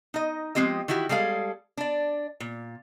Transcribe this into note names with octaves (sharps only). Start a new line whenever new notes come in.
D#4 D#5
F3 G#3 C4 G4 D#5
D#3 E3 E4 F#4 G4
G3 G#3 G#4 A4 F5
D4 D5
A#2